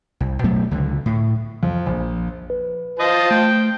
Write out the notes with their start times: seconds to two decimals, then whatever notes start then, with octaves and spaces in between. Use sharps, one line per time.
0.20 C2
0.44 B2 F#3 A3 B3
0.71 C#2 D3
1.06 A2
1.63 F2
1.86 A#1
2.50 B4
2.99 F4 C5 D#5 A5
3.31 A3 G5